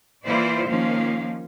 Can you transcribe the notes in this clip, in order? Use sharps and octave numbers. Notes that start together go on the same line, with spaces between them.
E3 A#3 E4 F4 C5 D5
D#3 F3 A#3 C#4 F5